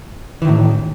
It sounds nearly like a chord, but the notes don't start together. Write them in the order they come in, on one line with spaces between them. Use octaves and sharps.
E3 D#3 A2